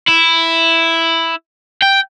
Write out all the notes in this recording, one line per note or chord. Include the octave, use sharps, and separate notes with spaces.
E4
G5